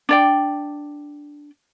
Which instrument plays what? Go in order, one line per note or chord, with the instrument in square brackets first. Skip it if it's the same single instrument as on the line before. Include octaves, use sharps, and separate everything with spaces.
[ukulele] D4 D5 G5